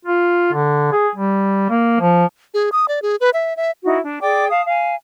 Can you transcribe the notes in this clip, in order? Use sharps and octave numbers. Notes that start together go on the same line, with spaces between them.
F4
D3
G#4
G3
A#3
F3
G#4
D#6
D5
G#4
B4
E5
E5
D#4 E4 F#4
D4
G#4 D5 G5 D6
F5 A5 D#6
F5 G#5